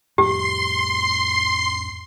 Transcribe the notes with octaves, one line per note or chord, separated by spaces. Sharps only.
F2 A2 A3 G4 C6 C7